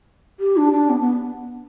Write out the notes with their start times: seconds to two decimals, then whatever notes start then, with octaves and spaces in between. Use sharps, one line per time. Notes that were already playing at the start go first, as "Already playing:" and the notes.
0.40 G4
0.57 D4
0.73 D4
0.90 B3
1.01 B3